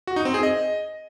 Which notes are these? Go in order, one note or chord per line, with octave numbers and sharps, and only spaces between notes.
F#4
D#4
C4
G#4
D#5